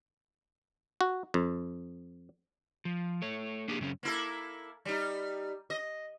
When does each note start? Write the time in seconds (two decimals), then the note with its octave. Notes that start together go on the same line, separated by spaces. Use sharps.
1.01 F#4
1.34 F2
2.85 F3
3.22 A3 C#5
3.68 A#3 D4 G4 G#4
3.80 F#2 C#3 C4 C#4
4.03 A#3 E4 A4
4.85 G3 D#4
5.70 D#5